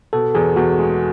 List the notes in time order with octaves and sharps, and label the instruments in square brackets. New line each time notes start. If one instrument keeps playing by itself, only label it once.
[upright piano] B2 [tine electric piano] A4
[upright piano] E2 [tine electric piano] G#4
[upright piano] E2 [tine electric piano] F#4
[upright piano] G#3